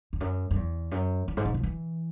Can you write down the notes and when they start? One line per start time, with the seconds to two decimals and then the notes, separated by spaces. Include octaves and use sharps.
0.13 E2
0.21 F#2
0.51 F#2
0.56 E2
0.91 F#2
1.28 E2
1.37 G#2
1.45 C#3
1.54 B2
1.60 F#3
1.63 E3